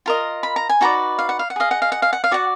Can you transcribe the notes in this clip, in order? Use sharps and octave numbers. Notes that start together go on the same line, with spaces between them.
F4 A#4 D#5
B5
A#5
G#5
D#4 F#4 B4 D5 A#5
F5
F#5
F5
F#5
G#4 D#5 F5
F#5
F5
F#5
F5
F#5
F5
F#4 D5 F#5